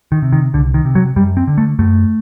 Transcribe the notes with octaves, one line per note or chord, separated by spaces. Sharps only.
D#3
C3
D#3
C2 D3
D#3
C3
F#3
F#2 G3
C4
D3
A3
F#2 A3